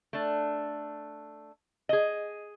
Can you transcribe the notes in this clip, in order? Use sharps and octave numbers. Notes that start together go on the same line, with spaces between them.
A3 D4
G#4 D#5